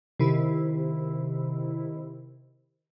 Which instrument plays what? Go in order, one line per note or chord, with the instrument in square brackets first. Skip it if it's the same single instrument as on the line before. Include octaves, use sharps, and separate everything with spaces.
[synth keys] C3 D#3 E4